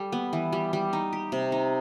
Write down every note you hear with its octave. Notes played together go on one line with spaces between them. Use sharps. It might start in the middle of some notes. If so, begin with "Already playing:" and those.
Already playing: G3 A4
B3
E3
G3
G3
D#4
G4
C3
D#4